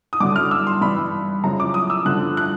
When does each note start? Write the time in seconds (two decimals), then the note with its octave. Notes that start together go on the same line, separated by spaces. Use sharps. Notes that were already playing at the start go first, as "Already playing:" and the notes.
0.13 D#6
0.20 G2 D3 F#3 D6
0.36 F6
0.51 E6
0.67 C6
0.81 G2 E3 B5
1.44 F#2 C#3 F3 A#5
1.60 D6
1.74 D#6
1.90 E6
2.05 G2 D3 F3 F#6
2.37 F#6